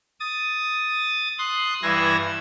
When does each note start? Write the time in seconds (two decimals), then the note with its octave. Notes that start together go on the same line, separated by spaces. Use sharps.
0.20 D#6 A6
1.38 C6 D#6 F#6
1.83 G2 E3 E4 E6 G#6 A#6